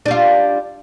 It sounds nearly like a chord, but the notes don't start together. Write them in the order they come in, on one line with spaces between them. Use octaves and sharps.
D4 G3 F4